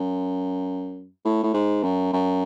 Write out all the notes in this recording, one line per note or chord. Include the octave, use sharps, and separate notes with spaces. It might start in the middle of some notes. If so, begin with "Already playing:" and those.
Already playing: F#2
A2
A2
G#2
F#2
F#2